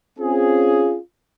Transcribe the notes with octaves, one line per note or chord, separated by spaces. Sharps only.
C4 C#4 F4 G#4